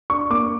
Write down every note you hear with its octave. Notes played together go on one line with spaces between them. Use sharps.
D4 C#6
A#3 D6